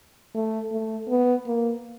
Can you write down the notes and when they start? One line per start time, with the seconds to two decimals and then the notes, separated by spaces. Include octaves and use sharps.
0.35 A3
0.72 A3
1.09 B3
1.46 A#3